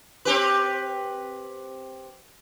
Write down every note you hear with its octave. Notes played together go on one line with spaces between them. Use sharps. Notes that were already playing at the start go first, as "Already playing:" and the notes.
C4 G4 B4